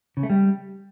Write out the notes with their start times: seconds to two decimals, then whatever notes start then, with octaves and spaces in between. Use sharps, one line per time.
0.17 C#3
0.23 A3
0.30 G3